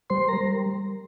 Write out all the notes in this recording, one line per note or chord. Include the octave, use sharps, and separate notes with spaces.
G3 C5 C6
A#4 A#5
G3